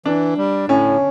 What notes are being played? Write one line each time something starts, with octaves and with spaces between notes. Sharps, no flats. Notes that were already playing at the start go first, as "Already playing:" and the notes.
E3 D4
G3
A2 C#4